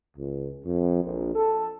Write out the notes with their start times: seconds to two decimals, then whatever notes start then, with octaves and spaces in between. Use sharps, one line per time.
0.17 C#2
0.65 F2
1.03 A#1
1.35 A4